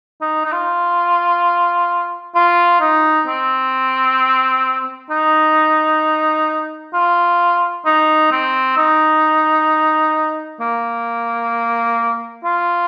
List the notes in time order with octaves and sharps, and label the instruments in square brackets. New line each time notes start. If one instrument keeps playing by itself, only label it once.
[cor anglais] D#4
D#4
F4
F4
D#4
C4
D#4
F4
D#4
C4
D#4
A#3
F4